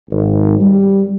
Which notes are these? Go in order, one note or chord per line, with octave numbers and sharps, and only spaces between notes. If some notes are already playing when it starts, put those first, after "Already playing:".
G#1
G3